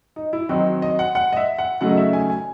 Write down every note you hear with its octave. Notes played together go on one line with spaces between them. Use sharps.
D#4
E4
D#3 F#3 C4 D#4 F#4
D#5
F#5
F#5
D#5
E5
F#5
C#3 F#3 A3 D#4 F#5
D#5
E5
G#5
G#5